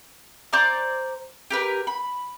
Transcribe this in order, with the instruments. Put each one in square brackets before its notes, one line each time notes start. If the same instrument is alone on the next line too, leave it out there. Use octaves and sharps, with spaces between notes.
[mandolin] C5 D5 A#5 D6
G4 A#4 B4
B5